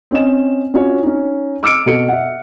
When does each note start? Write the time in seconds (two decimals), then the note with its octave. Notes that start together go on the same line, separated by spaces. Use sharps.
0.11 C4 C#4 D#5 E7
0.74 C#4 F4 F#4 C#5
1.03 C#4 D#4
1.63 D6 E6 F6 C#7 D7
1.86 B2 A4 C#7
2.08 E5 F#5